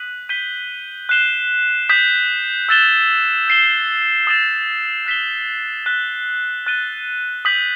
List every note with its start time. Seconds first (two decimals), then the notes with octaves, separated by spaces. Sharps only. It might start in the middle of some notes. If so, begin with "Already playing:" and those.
Already playing: D#6 F#6 B6 D#7 F#7
0.29 G6 B6 D#7 G7
1.09 F#6 C7 E7 G7
1.89 D#6 G6 B6
2.69 E6 A6 E7 G7
3.48 G6 C7 E7 G7
4.27 D#6 A6 E7 G7
5.06 F#6 B6 E7 G7
5.86 F#6 B6 E7 G7
6.66 F#6 A6 D#7 G7
7.45 D#6 G6 B6 F#7